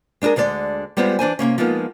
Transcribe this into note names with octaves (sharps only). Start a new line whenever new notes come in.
G#3 D4 D#4 G#4 A#4
D2 D3 G#3 D5
G3 G#3 B3 C4 F4 G4
E3 D4 C5 G#5
C3 D#3 A#3 C#4
F3 G#3 A#3 B3 D#4 F4